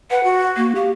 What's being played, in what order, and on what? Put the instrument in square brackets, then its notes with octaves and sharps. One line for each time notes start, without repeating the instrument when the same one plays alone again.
[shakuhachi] B4 [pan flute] F#5
[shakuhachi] F#4
[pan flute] A#3
[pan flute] G4 [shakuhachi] F5